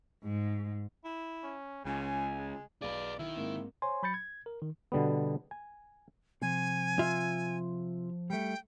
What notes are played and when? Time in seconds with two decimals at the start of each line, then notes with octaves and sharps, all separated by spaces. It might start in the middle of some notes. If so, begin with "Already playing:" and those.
0.23 G#2
1.05 E4
1.43 C#4
1.85 C#2 C#3 G#5
2.38 G#3
2.82 B1 G#4 B4 D5 F5
3.19 D#3 E4
3.36 G#2 A#3 C4
3.82 C5 C#5 G#5 C6
4.03 F#3 B5 G6 A6 C#7
4.14 G#6
4.46 A#4
4.62 D#3
4.92 B2 D3 G3 B3
5.51 G#5
6.42 C3 F3 G#5
6.99 F4 E5
8.30 G3 A3 G5